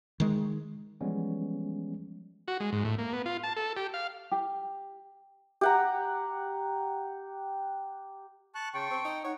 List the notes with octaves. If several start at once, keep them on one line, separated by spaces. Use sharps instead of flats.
D#3 G#3
E3 F3 G3 G#3 B3 C#4
F#4
G#3
G#2
A2
A#3
B3
F4
A5
A4
G4
F5
G4
G4 F#5 A#5
A5 C#6 F#6
C#3 G5 A5 C6 C#6
C4
D#4
D#4 C#5 F#5